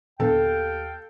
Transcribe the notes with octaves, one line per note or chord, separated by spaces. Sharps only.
D#2 A#2 D3 B3 A4 F5 G5